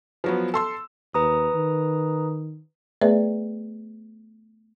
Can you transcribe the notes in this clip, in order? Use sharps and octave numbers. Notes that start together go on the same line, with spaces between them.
F3 F#3 B3
A4 C6 E6
D#2 B4 A#5 D#6
D#3
A3 B3 G#4 B4 D5 E5